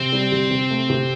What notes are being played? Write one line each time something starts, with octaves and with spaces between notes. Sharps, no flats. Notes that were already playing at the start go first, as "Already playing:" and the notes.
Already playing: C3 C4
G3
C3
C3
A3
C3